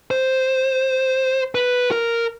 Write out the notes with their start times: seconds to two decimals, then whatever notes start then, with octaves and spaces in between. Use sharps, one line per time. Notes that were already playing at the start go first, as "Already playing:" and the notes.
0.11 C5
1.55 B4
1.91 A#4